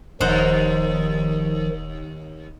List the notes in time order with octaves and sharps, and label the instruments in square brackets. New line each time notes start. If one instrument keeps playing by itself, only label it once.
[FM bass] D#1 [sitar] D#2 [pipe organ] D#3 F3 [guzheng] D#4 C5 F#5